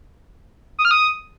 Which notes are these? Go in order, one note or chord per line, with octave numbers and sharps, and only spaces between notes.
D#6
F6
D#6